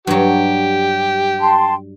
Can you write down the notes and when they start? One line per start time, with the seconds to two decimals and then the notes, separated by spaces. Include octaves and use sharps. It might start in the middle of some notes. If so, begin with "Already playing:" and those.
0.07 G2 F#3 G4
1.40 G5 A5 C6